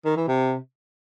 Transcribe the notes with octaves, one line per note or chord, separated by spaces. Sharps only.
D#3
E3
C3